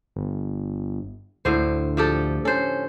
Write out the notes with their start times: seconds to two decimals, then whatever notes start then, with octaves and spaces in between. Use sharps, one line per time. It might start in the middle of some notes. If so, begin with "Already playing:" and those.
0.16 G1
1.45 D2 A2 D3 C5
1.97 F3 G4 A4
2.45 C#4 A4 C5